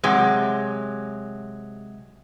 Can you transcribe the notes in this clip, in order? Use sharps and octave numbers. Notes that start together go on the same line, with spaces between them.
C3 F#3 G#3